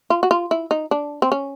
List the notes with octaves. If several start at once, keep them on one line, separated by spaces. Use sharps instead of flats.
F4
F#4
F4
E4
D#4
D4
C4
C#4